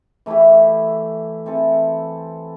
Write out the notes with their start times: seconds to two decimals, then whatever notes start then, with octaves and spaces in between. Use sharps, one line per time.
0.26 E3 A3 E4 G4
1.46 E3 C4 A4